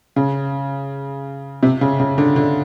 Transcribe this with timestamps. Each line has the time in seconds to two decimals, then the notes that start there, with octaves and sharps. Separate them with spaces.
0.16 C#3
1.63 C3
1.81 C#3
2.00 C#3
2.18 D3
2.36 D3